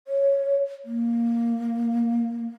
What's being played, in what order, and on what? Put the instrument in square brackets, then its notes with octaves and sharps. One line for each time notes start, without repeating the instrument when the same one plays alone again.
[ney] C#5
A#3